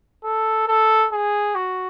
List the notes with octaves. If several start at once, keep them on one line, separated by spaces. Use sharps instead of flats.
A4
A4
G#4
F#4